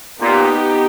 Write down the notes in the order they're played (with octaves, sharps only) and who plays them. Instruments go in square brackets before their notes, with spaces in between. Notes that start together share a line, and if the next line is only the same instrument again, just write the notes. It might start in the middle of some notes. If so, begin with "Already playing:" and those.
[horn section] A#2 [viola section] B3 D#4 G4